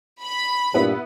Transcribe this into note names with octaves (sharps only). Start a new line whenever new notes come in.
B5
G2 A#2 B3 E4 B4